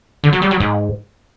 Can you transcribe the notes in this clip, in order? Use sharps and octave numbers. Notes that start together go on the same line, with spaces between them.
D3
F#3
G3
F#3
G#2